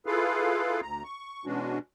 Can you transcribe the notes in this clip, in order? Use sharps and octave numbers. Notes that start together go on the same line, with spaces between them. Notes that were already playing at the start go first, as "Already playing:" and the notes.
E4 F4 G#4 A4 B4 F5
D2 A#5
C#6
B2 E3 G#3 C#4 D4 F#4